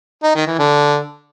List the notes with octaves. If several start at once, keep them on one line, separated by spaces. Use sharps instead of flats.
D#4
D#3
E3
D3